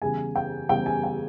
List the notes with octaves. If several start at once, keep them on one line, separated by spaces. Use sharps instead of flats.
E2 C#3 G3 G#5
G5
E2 C#3 G3 G5
G#5
G5